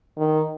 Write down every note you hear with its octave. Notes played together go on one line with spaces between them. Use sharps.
D#3